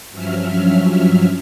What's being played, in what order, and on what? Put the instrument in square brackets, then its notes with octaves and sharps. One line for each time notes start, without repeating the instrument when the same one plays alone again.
[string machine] G2 F3 F#3 C#4 E5 F6